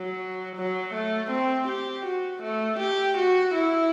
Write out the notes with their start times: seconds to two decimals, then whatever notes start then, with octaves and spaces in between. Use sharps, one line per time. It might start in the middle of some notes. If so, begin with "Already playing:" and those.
Already playing: F#3
0.56 F#3
0.94 A3
1.31 C4
1.68 G4
2.06 F#4
2.43 A3
2.80 G4
3.18 F#4
3.55 E4